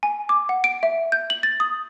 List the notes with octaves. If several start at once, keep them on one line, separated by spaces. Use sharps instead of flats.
G#5
D6
F#5
D7
E5
G6
F#7
A6
D#6